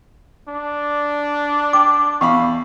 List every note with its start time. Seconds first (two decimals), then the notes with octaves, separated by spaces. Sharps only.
0.48 D4
1.73 G5 D6
2.21 E2 F5 B5 C#6